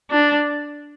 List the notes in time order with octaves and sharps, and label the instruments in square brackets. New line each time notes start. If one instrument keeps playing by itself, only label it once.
[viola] D4